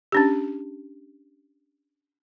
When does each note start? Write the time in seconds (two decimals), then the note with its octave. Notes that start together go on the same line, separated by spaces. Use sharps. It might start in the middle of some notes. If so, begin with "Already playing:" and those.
0.12 C#4 D4 G4